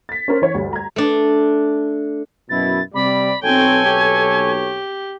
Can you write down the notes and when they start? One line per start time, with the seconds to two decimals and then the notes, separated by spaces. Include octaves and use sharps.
0.09 A6 B6
0.28 C#4 A#4 C5
0.42 E3 C#5
0.54 D2 G2 G3
0.73 A#5 G#6
0.96 A3 D4
2.50 F#2 B2 E4 A6
2.94 C3 G3 D5 B5
3.43 B1 C4 A4 C#5 G5 G#5
3.88 G4